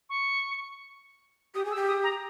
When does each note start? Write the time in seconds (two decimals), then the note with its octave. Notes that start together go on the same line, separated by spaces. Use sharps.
0.09 C#6
1.55 G4 D#6
1.65 G#4
1.71 E6
1.76 G4
1.87 D#6
2.04 A#5